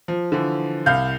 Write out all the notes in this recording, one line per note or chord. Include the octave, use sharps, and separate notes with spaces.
F3
D3 E3 F3
C2 F5 G6